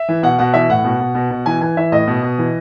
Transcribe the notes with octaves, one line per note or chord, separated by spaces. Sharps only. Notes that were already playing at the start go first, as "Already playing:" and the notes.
Already playing: E5
E3
B2 F#5
B2 F#5
E3 E5
A2 F#5
B2
B2
B2
B2
E3 G#5
E3 G#5
E3 E5
A2 D#5
B2
B2
E3